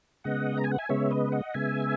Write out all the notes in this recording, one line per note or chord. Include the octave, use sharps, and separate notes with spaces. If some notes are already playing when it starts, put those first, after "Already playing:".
C#3 G#3 B3 D#5 F#5
A#5
G#5
F#5
E5 G#5
C#3 G#3 B3 C#5 E5
B4 D#5
D#5 F#5
C#3 G#3 B3 E5 G#5